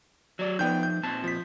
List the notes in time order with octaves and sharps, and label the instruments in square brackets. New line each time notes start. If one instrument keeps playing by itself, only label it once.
[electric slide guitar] F#3 D5
[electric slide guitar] F3 D#4 [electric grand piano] B3 G5 G6
[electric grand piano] G6
[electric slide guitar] A#2 C4 A5
[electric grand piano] F3 B6